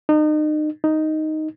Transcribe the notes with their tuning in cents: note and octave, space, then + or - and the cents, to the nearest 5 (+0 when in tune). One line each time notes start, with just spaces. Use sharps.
D#4 -35
D#4 +0